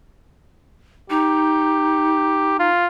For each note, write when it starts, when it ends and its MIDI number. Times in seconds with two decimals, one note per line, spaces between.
1.10 2.69 63
1.10 2.57 67
2.59 2.87 65